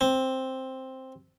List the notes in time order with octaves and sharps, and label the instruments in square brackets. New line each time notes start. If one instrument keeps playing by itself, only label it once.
[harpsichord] C4